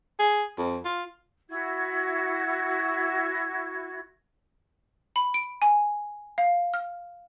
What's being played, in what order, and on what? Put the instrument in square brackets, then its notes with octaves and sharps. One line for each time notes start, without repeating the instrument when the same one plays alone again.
[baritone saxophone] G#4
F2
F4
[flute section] E4 F#4 G#6
[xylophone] B5
D7
G#5
F5
F6